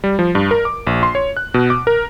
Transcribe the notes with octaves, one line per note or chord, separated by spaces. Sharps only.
G3
F3
G2
A#4
D6
A#1
C6
C#5
F#6
B2
D6
A#4